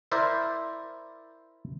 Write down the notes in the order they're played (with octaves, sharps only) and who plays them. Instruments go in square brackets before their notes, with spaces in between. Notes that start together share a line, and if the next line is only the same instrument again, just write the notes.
[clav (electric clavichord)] E4 A#4 C5 D5 E5